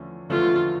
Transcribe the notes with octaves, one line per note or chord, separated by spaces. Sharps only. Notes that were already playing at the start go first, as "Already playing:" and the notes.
Already playing: E2 D3 F3 A3 C#4
E2 D3 F3 A3 C#4 F4